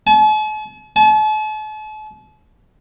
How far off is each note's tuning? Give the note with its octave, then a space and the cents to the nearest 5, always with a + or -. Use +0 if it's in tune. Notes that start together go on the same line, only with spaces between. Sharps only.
A5 -45
A5 -40